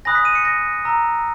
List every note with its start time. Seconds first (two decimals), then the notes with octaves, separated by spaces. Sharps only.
0.05 G#5 B5 D#6 F#6 A#6
0.15 B6
0.25 D#7
0.35 C#7
0.45 A#6
0.85 A#5 E6